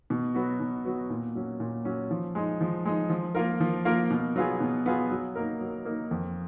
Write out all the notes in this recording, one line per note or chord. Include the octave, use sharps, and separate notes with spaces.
B2
F#3 B3 F#4
B2
F#3 B3 F#4
A#2
F#3 C#4
A#2
F#3 C#4
F3
G#3 D#4
F3
G#3 D#4
F3
A#3 F4 A#4
F3
A#3 F4 A#4
B2
F#3 B3 F4 G#4
B2
F#3 B3 F4 G#4
F#3
A#3 D#4 A#4
F#3
A#3 D#4 A#4
F2